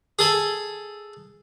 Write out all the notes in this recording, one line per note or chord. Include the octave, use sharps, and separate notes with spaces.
G#4 A4 G#5